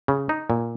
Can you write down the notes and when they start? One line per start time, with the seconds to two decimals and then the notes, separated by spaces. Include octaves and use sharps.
0.08 C#3
0.29 D#4
0.50 A#2